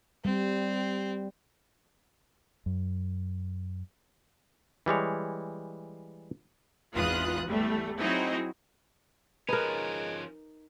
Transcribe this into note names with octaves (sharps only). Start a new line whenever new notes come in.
G3 C4
F#2
E3 G3 G#3 C#5
G#1 E2 F4 B4 D#6 F#6
E2 G3 A3
F#3 C4 D#4 E4 F#4 G#4
F3 G#3 C#4 D#4 A#4 B4